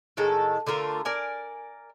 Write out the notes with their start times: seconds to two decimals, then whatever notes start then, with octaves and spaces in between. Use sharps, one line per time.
0.17 A2 D#3 G#3 A4
0.67 D3 A3 F4 A#4
1.05 A#4 D5 G#5